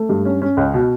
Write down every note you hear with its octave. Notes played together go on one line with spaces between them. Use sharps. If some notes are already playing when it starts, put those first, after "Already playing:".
Already playing: A3
G2
C#4
C#4
C#2
B2